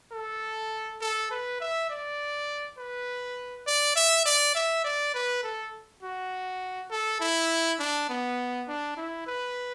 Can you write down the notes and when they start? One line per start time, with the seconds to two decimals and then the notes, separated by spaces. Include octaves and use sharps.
0.12 A4
1.01 A4
1.31 B4
1.61 E5
1.90 D5
2.78 B4
3.67 D5
3.96 E5
4.25 D5
4.55 E5
4.84 D5
5.14 B4
5.43 A4
6.03 F#4
6.91 A4
7.20 E4
7.79 D4
8.09 B3
8.68 D4
8.97 E4
9.27 B4